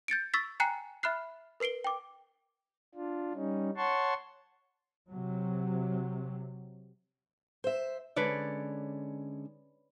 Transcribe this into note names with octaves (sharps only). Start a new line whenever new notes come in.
G6 A6 C#7 D7
C#6 E6 A6 B6
G5 G#5 A#5 F#6 C7 C#7
E5 B5 F6 F#6 C7
A#4 B4 C7 D7 G7
G5 D6
D4 F4
G3 C#4 D#4
C#5 F#5 A5 C6 C#6
C3 F#3
C5 E5
D3 G#3 C#4 B4 C#5 D5